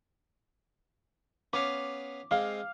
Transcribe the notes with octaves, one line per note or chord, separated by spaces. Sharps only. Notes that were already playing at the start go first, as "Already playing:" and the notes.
B3 C#4 F5 D6
G#3 C4 F5